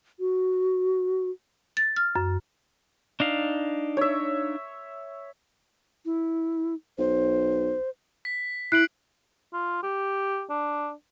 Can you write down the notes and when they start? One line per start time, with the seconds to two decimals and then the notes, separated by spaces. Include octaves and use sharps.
0.20 F#4
1.77 A6
1.96 F6
2.16 F#2
3.20 D4 D#4 F5
3.97 C#5 E5
6.05 E4
6.98 B1 C5
8.25 B6
8.72 E4 F#6 C7 D7 F#7
9.53 F4
9.83 G4
10.50 D4